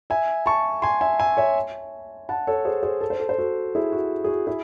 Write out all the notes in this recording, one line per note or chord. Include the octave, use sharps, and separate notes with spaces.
E5 G#5
A5 C#6
G#5 C6
E5 G#5
E5 G#5
C#5 E5
F#5 A5
A4 C#5
G#4 C5
G#4 C5
A4
C5
A4
C5
F#4 A4
E4 G#4
F#4
G#4
F#4
E4 G#4